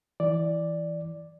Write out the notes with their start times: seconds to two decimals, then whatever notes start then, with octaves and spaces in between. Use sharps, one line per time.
0.20 E3 D5